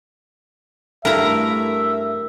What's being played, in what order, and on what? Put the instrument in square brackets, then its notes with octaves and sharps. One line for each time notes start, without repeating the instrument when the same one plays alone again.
[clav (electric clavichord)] G2 E4 F5 [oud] A3 [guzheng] A#4 A#5 [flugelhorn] E5